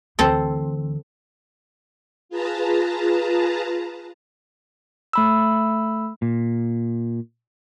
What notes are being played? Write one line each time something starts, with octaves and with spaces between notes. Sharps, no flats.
D2 E3 C4 A4
F4 G#4 B4 A5 A#5
A3 B5 E6
A#2